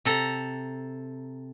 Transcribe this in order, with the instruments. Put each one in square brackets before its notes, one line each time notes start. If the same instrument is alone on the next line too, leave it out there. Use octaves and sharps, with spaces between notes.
[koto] C3 A4 A#5